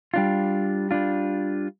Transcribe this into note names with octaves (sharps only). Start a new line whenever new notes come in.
G3 D4 F4
G3 D4 F4